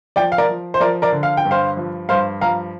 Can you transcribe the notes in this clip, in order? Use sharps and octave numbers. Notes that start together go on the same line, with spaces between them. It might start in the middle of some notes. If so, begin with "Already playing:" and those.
F3 D5 G5
F5
A#4 D5
F3
C5
F3 A#4 D5
A#4 D5
D3
F5
G5
G2
C5 F5
F3
G2 C5 F5
F3 F5 A#5